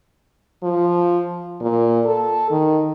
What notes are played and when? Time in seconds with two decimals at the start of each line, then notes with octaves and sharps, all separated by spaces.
0.63 F3
1.61 A#2
2.06 A4
2.51 D#3